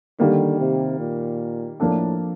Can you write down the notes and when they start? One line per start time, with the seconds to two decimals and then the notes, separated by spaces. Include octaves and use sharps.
0.19 D3 D#3 G3 A#3
0.59 C3
1.00 A#2
1.80 A2 F3 A#3 D4 A4